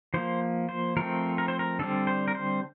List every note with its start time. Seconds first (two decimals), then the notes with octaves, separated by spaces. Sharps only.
0.14 F3 A#3 C5
0.69 C5
0.97 F3 A3 C4 A#4
1.38 A#4
1.48 C5
1.59 A#4
1.79 D3 G3 C4 A4
2.07 C5
2.28 A#4
2.35 C5